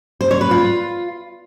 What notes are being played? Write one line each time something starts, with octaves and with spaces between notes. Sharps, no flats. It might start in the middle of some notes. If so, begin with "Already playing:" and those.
C5
C#5
B4
F4